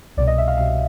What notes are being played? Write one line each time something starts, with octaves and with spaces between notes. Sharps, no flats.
C2 B2 D5
D#5
E5
F5
C2 B2 F5